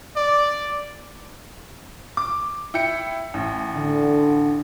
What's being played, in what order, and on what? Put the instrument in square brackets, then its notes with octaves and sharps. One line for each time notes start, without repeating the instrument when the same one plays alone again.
[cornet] D5
[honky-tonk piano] D6
E4 G5 C#7
A1
[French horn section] D3